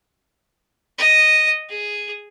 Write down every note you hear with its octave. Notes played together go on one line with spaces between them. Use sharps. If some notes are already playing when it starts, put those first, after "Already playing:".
D#5
G#4